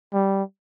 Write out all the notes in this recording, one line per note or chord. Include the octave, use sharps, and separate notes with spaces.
G3